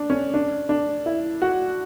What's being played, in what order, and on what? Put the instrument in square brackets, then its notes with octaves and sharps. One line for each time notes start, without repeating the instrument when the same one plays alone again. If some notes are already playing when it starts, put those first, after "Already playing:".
Already playing: [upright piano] D4
C#4
D4
D4
E4
F#4